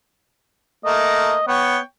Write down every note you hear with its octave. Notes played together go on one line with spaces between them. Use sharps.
A3 A#3 D#5
B3 C#5 G5